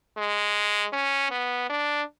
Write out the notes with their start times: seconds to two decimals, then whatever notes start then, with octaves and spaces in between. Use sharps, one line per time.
0.18 G#3
0.93 C#4
1.31 B3
1.70 D4